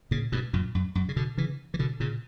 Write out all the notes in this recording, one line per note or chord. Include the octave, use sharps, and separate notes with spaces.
A#2 C#3
G2 B2
F#2 A#2
F#2
F#2
C#3
B2 D3
C#3 E3
E3
B2 D3
A#2 C#3